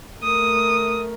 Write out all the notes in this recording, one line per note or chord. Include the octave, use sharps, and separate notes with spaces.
A3 A#4 D#6